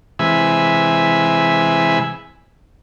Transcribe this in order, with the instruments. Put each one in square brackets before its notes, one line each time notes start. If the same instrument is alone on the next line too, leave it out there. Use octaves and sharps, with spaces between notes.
[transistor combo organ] C3 E3 G#3 E5 G#5 B5